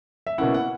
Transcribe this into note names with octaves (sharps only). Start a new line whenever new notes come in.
E5
B2 A#3 C#4 E4 F#5
F#5